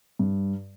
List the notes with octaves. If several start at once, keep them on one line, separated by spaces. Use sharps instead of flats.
G2